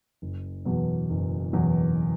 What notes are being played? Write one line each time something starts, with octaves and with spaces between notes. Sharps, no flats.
F#1
E2 B2 F#3
F#1
E2 B2 F#3